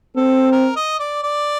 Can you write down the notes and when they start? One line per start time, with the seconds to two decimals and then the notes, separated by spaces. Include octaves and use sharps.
0.16 C4 A4
0.52 A#4
0.76 D#5
0.99 D5
1.23 D5